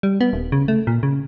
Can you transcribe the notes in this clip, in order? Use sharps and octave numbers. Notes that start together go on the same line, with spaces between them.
G3
B3
D#1
C#3
A3
A#2
C#3